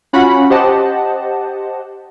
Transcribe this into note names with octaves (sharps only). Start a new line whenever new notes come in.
C#4 F4 F#4 F#5 B5
G4 C5 D#5 F#5 A5